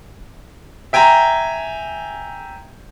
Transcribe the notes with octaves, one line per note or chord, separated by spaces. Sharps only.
E5 G5 G#5 A#5